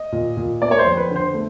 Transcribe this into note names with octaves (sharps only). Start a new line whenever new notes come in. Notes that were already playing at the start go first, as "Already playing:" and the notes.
Already playing: D#5
A#2
A#2
A#3 D5
C#5
C5
F2
B4
D3
C5
A3